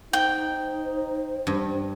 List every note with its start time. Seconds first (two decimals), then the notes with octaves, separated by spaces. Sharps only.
0.13 D#4 C5 G5
1.47 G2